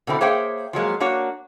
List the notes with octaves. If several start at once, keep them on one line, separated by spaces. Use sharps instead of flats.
B2 D3 C4 E4
A#3 G#4 C5 C#5 E5 G5
F3 F#3 G#3 A#3
A#3 D4 F#4 C#5